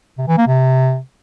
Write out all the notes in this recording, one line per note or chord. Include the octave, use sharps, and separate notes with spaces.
C3
E3
A#3
C3